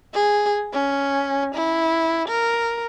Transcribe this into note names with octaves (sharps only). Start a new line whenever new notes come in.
G#4
C#4
E4
A#4